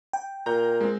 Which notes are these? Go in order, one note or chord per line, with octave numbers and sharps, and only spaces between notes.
G5
A#2 A#5 G6
G#3 C4